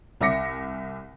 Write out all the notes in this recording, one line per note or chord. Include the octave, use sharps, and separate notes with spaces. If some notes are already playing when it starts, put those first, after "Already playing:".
C2 E5 D6 A#6 C#7